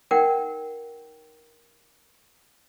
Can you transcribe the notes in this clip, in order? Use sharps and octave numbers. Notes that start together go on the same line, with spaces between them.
D#4 A#4 F#5 G5